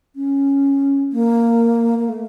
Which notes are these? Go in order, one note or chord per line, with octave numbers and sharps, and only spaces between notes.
C#4
A#3
A#3
A3